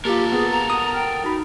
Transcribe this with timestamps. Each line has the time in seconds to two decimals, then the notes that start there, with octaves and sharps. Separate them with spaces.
0.05 A#3 F4 G4 A4 A#4
0.32 B3 G#4
0.52 A#5
0.70 F#5 D#6
0.94 G5 F6
1.25 D#4 F#4 A#5 B5